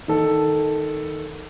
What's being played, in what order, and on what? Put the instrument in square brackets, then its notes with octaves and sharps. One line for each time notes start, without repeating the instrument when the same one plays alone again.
[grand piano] D#3 A4